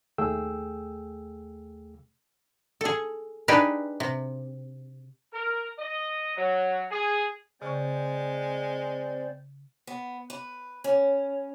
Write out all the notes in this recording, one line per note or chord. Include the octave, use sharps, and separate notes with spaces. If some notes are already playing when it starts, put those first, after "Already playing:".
D#2 A3 G#4 G5 E6
G#4 A4
D4 D#4 G4 G#4 B4
C3
A#4
D#5
F#3
G#4
C#3 G#3 C4 C5 D5 C#6
B3
B4
C#4